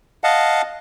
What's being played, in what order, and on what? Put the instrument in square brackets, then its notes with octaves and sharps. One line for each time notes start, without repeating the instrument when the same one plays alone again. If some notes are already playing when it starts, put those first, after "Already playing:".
[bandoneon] D#5 F5 F#5 A5